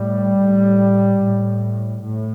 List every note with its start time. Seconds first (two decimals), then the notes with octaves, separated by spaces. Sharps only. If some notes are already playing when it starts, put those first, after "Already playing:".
Already playing: A2 G3
0.42 A2
1.22 A2
2.03 A2